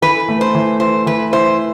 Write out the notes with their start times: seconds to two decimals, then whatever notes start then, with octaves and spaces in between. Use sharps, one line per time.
0.02 E3 B4
0.29 A3
0.41 C5
0.55 E3
0.80 E4 C5
1.06 E3 B4
1.32 E4 C5